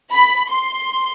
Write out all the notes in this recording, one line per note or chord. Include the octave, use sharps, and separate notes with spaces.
B5
C6